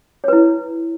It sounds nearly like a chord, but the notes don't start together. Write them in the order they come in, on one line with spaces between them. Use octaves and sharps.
C#5 B4 E4